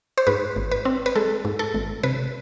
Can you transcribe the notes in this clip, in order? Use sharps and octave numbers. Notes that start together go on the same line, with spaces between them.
C5
G#2 B4
G#1
B4
C4
B4
G#3 A4
G#2
A4
G#1
C3 B4